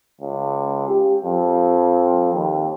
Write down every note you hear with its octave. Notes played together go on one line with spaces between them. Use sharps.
C#2
G4
F2
D#2